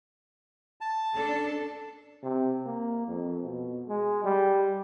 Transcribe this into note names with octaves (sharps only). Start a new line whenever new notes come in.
A5
C#4 D4 A4
C3
A#3
F2
B2
G#3
G3